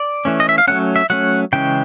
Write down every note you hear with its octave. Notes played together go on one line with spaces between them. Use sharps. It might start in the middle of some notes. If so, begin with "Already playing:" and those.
Already playing: D5
E3 A3 C#4
D#5
E5
F5
F#3 A3 C#4 F#5
E5
F#3 A3 C#4 F#5
C#3 E3 G#3 C#4 G5